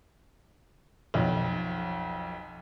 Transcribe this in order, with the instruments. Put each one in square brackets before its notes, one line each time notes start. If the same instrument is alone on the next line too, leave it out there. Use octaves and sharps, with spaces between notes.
[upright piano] B1 F2